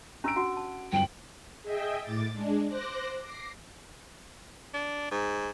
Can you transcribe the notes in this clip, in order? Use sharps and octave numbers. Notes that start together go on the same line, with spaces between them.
C#4 D4 G4 A#5 E6 D7
F#4 F#5
A5
G1 F#2 G5 F#7
G#4 D#5 E5 G5
A2 D6 A6
G#3 D4
C5 D6 F#6 A#6
D6 A#6 C7
D4
G#2